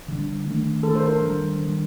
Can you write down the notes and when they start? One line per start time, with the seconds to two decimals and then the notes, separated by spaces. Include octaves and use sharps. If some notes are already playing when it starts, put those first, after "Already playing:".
0.08 D3 G3 D4
0.46 D#3 A3 D4
0.83 D#3 A3 D4 A4
0.96 C5
1.02 A#4
1.21 D#3 G3 D4
1.59 D#3 G3 D4